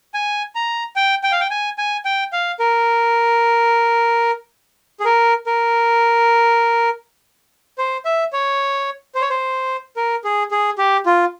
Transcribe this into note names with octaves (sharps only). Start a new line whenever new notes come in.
G#5
A#5
G5
G5
F5
G5
G#5
G#5
G5
F5
A#4
G#4
A#4
A#4
C5
E5
C#5
C5
C#5
C5
A#4
G#4
G#4
G4
F4